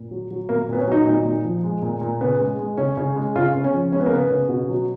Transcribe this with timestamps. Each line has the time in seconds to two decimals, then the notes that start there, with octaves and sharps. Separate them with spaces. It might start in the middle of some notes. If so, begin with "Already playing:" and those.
Already playing: A#2
0.11 F#3
0.31 F#3
0.49 A#2 A#3
0.69 A#2 B3
0.79 C#4
0.87 F#3 D#4
1.06 A#2 D#4
1.25 A#2
1.44 F3
1.64 G#3
1.82 A#2
2.01 A#2
2.21 C#3 B3
2.39 G#3
2.59 G#3
2.77 C#3 C#4
2.97 C#3
3.16 G#3
3.36 C#3 F4
3.55 C#3
3.64 C#4
3.73 F3
3.92 G#3 C#4
4.00 B3
4.06 A#3
4.12 C#3 B3
4.30 C#3
4.49 B2
4.69 F#3